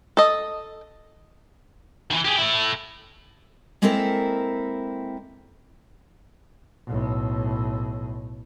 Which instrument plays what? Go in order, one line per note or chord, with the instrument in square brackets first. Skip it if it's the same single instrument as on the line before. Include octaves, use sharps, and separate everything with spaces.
[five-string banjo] A4 D#5
[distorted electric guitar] D#3 E3
G4 G#4
A3 E4
[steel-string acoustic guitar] G#3 A#3 C4 E4 A4 A#4
[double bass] B1 A2